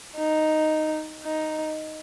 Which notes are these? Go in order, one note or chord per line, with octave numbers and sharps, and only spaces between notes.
D#4
D#4